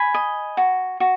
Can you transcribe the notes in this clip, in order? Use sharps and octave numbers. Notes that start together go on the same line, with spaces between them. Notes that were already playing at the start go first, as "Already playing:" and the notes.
Already playing: G#5 B5
D#5
F#4
F#4